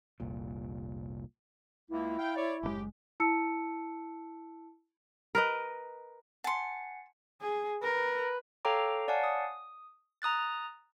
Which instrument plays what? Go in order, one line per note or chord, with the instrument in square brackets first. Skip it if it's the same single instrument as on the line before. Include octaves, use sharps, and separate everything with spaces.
[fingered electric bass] F1 C2 A#2
[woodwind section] C#2 A#3 [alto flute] E4
[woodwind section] F5 G5
C#5 D5
[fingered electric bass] F#1 C#3 G#3 [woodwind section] A2 G4
[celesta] E4 A5 E6 C#7
[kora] A#4 B4 D#5
[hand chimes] F#5 G#5 C#7 [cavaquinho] A5 C6
[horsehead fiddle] G#4
[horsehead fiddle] A#4 [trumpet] B4
[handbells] A4 C#5 F5 G5 A#5 D6
C#5 D5 F5 F#5 G#5 A5
D#6
A#5 D#6 F#6 A6